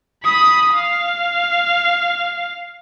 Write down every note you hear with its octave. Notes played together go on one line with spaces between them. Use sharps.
B5 D#6
F5